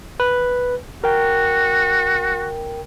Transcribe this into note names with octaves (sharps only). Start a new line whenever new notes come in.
B4
F#4 A#4 G5